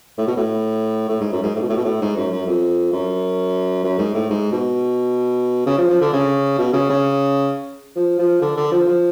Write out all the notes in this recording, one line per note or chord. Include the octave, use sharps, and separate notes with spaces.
A2
B2
A2
A2
G#2
F#2
G#2
A2
B2
A2
B2
A2
G#2
F#2
F#2
F2
F#2
F#2
G#2
A2
G#2
B2
C#3
F3
F3
D3
C#3
B2
C#3
C#3
F3
F3
D3
D3
F3
F3